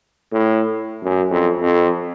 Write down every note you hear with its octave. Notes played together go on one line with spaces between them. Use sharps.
A2
F#2
F2
F2